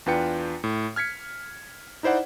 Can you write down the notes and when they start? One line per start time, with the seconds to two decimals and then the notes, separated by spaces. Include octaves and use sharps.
0.06 E2 D4 F4 B4 G5 C#7
0.64 A2
0.96 F6 G#6 B6 C#7
2.03 D#4 E4 C5 D5 F#5